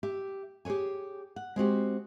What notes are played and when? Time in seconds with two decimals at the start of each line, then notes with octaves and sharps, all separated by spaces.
0.03 G4 E5
0.65 G4 G#4 B4 C#5 G#5
1.36 F#5
1.56 G#3 C4 F#4 G4